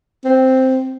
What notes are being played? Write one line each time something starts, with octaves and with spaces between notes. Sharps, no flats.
C4